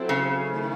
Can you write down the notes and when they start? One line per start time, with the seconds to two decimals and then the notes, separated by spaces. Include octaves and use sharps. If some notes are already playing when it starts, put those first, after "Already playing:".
Already playing: F#3 C4 E4 A4 C5
0.09 C#3
0.46 D#3 A3 E4